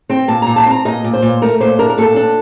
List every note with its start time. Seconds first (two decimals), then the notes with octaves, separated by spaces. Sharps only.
0.09 C4 G5
0.28 A#2 A5
0.42 A#2 A#5
0.56 A5
0.66 C4 A#5
0.85 A#2 D#5
1.04 A#2
1.13 C5
1.22 A#2
1.42 A3 A#4
1.60 A#2 C5
1.79 D4 A#4
1.90 A#4
1.98 A#2 A4
2.16 D4